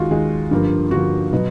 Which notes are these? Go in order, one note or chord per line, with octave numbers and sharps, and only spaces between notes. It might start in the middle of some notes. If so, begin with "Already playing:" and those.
Already playing: D#2 D#3 G#3 F4 F#4
D#2 D#3 G#3
G2 D3 F3 A#3
G2 D3 F3 A#3 F#4
B2 F#3 B3